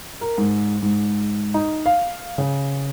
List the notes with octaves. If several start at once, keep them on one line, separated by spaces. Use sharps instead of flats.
A#4
G#2
G#2
D#4
F5
C#3